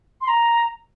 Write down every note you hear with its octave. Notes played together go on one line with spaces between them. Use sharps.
C6
A#5